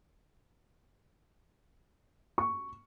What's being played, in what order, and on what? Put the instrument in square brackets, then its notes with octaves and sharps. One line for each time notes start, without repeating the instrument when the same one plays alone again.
[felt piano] C#6